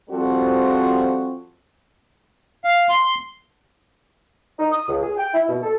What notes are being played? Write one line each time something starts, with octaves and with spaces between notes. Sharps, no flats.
F3 G3 C4 F#4 A4
F5
C6
D#4
D#6
C#2
G#4
G5
E4
B2
A4